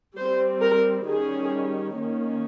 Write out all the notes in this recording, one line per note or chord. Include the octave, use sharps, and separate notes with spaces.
G3 C4 C5
A#4
D#3 G3 C#4 G#4
D#3 A#3 C#4